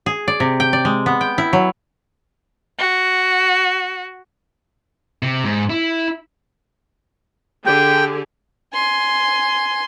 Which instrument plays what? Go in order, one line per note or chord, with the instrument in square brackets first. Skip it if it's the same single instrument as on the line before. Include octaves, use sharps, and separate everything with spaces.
[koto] G#4
D5
C3
G5
D5
G#3
B3
G5
E4
F#3
[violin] F#4
[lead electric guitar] C3
G#2
E4
[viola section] D3 G4 G#4 [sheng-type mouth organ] G5
[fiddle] G#5 C6